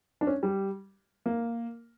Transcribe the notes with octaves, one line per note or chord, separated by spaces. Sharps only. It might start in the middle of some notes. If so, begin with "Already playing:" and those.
D4
C#4
G3
A#3